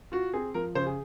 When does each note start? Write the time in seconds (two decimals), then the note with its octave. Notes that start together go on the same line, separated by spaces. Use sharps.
0.12 F4 F#4
0.33 C4 G#4
0.54 F3 A#4
0.75 C#3 C5
0.86 G#4